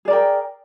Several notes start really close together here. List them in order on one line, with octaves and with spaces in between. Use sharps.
G#4 D5 A#4 G5